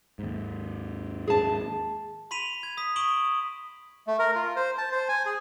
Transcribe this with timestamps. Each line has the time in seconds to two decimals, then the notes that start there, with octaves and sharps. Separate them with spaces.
0.19 D#2 G#2
1.28 G#4 A5
2.31 B5 C6 B6 D#7 F7
2.63 G#6
2.77 D#6 B6
2.96 C#6 D#6 D7 E7 F#7 G7
4.07 A3
4.19 A#4
4.35 F4
4.56 C5
4.78 A5
4.92 C5
5.09 G#5
5.26 G#4